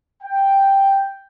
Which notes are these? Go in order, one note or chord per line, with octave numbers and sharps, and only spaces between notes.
G5